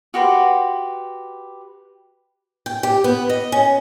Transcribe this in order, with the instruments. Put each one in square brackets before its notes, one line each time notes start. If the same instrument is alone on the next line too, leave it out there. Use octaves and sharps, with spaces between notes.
[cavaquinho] F#4 G4 B4 C6
[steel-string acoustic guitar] G5
G4
B3
D#5
C#4